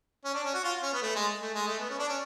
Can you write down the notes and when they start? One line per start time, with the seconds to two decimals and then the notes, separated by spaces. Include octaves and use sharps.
0.25 C#4
0.34 D4
0.44 C#4
0.54 F#4
0.63 F4
0.82 C#4
0.93 B3
1.02 A3
1.15 G#3
1.41 A3
1.54 G#3
1.67 A3
1.79 B3
1.89 C#4
1.99 D4
2.09 C#4